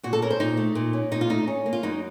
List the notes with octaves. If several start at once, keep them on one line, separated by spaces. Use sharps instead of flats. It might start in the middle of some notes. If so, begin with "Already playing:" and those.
A#2 F#4
A4
C#4 A#4
C5
A#2 D#4
A3
A#2
C#4
A#2 D#4
F4
A3 D#4
C#4
A#3
F4
F#2 D#4